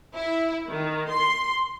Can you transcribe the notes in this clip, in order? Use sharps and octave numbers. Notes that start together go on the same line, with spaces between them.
E4
D#3
C6